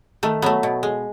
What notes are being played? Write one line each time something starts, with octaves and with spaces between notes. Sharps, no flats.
D#3 A3
F#3 A3 B3
B2
G#3